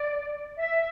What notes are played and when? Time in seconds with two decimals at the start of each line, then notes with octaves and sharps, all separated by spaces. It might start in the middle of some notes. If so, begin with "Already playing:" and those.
Already playing: D5
0.56 E5